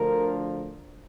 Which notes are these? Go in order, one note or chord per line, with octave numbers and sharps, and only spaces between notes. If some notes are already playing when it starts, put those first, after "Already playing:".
Already playing: D2 D3 F3 A#4